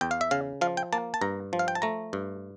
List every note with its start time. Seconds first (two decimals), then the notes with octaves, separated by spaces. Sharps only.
0.01 E2 G5
0.11 F5
0.21 E5
0.31 C#3 F5
0.61 F3 F5
0.77 G5
0.93 A#3 A5
1.14 A5
1.21 G2 A#5
1.53 F3
1.59 F5
1.68 G5
1.75 A5
1.82 A3 A#5
2.13 G2